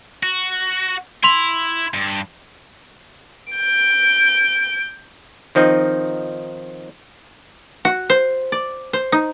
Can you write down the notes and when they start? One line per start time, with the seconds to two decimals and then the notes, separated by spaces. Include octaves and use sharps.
0.23 F#4
1.24 E4 C6 F7
1.94 G2
3.53 G6 D7
5.55 D#3 F3 C4 D#4
7.85 F#4
8.10 C5
8.52 D5
8.93 C5
9.12 D#4